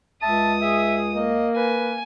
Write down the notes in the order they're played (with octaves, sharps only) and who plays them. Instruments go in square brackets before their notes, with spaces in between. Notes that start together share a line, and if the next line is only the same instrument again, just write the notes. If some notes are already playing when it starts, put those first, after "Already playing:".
[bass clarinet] C#2 [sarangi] E5 [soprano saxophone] A5 [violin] D#6
[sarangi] G#4 [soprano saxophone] E5
[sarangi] A#3 [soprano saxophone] D#5
[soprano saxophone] B4 [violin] G#5